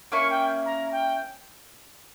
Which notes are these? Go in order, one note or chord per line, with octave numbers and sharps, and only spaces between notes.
A#3 C#4 E4 C#6
G5
A#5
G5